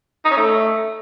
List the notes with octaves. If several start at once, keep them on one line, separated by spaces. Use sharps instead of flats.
D#4
C#4
A3